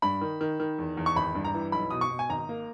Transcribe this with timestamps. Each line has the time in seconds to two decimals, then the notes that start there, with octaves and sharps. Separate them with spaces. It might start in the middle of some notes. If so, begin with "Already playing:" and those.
0.02 G2 B5
0.21 D#3
0.41 D#3
0.60 D#3
0.79 E2
0.97 E2
1.06 C#6
1.16 G#1 B5
1.35 G2
1.45 A#5
1.54 E3
1.72 B1 B5
1.90 B2 D#6
2.01 C#6
2.11 B2
2.19 G#5
2.30 G#1 A#5
2.49 A#3